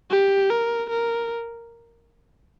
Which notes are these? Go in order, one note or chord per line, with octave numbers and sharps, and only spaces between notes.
G4
A#4
A#4